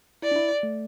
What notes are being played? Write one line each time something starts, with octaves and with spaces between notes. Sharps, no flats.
E4 D5
D4
E4
A3